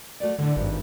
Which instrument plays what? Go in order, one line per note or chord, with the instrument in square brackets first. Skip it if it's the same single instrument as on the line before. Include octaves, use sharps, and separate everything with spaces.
[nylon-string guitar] A3 F#4 D5
[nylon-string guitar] A2 [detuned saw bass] D3
[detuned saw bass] G#1 [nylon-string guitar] G2